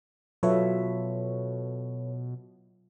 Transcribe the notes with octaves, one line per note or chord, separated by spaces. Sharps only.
B2 F#3 F4 A4 B4 C#5 E5